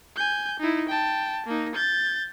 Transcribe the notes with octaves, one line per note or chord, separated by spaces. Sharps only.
G#5 G6
D#4 E4
G5 A5
A#3 D#4
G6 A6